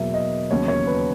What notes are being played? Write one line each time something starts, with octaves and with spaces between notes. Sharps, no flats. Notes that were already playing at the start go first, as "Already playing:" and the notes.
Already playing: E2 B2 F#3 A#3 E5
D#5
E1 D#2 C#3 F#3 C#5
C#5
B4